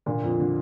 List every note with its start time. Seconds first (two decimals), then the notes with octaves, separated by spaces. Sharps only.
0.06 A#2 D3
0.23 F2
0.40 D3